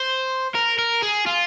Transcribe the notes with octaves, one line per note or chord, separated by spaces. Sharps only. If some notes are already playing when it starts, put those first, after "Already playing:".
Already playing: C5
A#4
A#4
G#4
F4